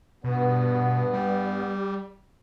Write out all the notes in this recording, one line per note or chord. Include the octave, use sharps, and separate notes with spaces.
G2 B2 B3
G3